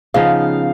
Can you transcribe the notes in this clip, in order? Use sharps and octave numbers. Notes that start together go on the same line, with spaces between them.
C#3 F3 B3 D#4 F5